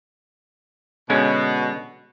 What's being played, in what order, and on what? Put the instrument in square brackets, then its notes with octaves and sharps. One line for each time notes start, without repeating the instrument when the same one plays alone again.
[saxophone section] B2 [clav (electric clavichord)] D3 G#3 C#4